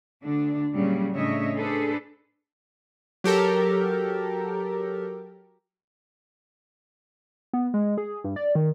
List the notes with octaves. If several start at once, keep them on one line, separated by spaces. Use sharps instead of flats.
D2 D3 D4
A#2 C#3 F#3 G3
A2 C#3 D4 C#5 D#5 E5
D4 G#4 A4 B4 C5
F#3 G4 A4 A#4
B3
G#3
G#4
G2
D5
D#3